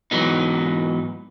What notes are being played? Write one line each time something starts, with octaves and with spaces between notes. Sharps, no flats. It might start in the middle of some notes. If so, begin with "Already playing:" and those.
G#2 E3 F#3 B3 D#4